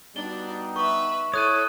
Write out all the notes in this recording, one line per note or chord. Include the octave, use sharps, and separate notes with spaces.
G3 B3 D4 D#4 F#4 G7
B4 E5 C#6
E4 A4 C#5 D#6 F#6 D#7